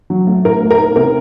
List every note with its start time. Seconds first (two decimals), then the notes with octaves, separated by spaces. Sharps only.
0.10 F#3
0.27 A3
0.45 A2 A#4
0.62 A3
0.71 A#4
0.79 D#4
0.96 C3 A#4